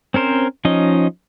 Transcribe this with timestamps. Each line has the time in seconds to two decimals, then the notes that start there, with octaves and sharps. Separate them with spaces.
0.14 C4 C#4 A#4 C5
0.65 F3 C#4 D#4 D#5